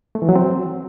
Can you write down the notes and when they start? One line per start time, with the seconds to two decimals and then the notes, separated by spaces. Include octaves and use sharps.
0.15 A3
0.22 E3
0.29 F#3
0.36 C4